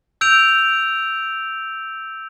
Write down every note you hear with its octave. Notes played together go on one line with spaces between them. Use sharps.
E6 G6 D7 F7